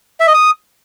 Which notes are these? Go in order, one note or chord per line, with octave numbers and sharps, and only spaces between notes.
E5
D#5
D#6